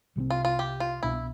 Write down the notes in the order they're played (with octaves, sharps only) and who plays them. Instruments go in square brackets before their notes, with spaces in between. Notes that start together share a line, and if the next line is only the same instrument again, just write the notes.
[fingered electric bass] C2 C3 G3 C4
[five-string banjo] F4
F4
G4
F4
[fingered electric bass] C2 B2 B3 D4 [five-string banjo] E4